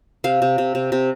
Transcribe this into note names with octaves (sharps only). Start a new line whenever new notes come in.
C3 F5
C3
C3
C3
C3